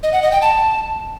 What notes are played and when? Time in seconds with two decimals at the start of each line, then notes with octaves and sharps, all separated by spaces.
0.03 D#5
0.13 F#5
0.22 D#5
0.32 G5
0.42 A5